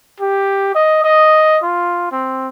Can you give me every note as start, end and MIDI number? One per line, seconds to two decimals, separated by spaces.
0.20 0.73 67
0.75 1.01 75
1.04 1.58 75
1.63 2.08 65
2.12 2.48 60